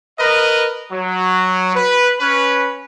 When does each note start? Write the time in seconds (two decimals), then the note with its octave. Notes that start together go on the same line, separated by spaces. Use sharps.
0.19 A#4 B4 D#5
0.92 F#3
1.75 B4
2.20 C#4 B4